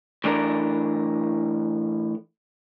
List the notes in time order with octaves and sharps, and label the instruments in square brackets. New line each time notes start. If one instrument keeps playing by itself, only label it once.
[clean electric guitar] A2 E3 D4 A4 A#4